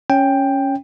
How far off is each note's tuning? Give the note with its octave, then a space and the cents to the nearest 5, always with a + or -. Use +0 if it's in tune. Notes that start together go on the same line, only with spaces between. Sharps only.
C#4 +0 G5 +10